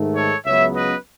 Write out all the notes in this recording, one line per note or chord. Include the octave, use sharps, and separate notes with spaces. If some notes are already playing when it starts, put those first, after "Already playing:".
Already playing: G#2 D#3 A3
A4 C#5
C#2 C#3 F#3 B3 C#5 E5
B4 D#5